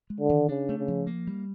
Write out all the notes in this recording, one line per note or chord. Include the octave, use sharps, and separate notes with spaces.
G#3
D3
D#3
C#3 D4
A3
C#3
F3
A#3
G3